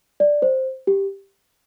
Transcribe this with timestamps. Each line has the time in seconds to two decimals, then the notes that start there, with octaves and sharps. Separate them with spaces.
0.20 D5
0.42 C5
0.87 G4